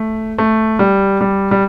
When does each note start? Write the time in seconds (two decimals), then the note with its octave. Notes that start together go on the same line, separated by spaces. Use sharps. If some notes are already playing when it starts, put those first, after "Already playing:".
Already playing: A3
0.38 A3
0.79 G3
1.21 G3
1.51 G3